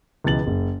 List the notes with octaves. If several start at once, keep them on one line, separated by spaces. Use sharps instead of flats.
C#2 B2 E3 A6 F#7
F#1